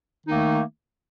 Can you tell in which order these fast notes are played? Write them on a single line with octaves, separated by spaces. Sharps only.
D#3 D#4 A#3 A3